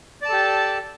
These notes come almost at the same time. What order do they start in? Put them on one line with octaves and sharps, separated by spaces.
D5 A5 A4 G4